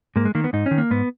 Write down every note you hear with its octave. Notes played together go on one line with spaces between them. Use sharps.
G#2 A#3
G#3
D#3 A#3
B3
G#2 D#4
C#4
D#3
A#3
G#2 B3